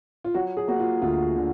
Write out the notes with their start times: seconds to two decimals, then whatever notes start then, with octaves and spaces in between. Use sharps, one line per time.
0.24 F4
0.34 F#3 F#4
0.57 G#4
0.68 A#3 F#4
0.79 F4
1.02 D2 F4
1.35 D3